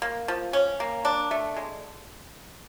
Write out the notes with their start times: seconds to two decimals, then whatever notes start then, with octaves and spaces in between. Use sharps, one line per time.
0.02 A#3
0.28 F3
0.53 C#4
0.80 A#3
1.05 D4
1.31 A3
1.56 G#3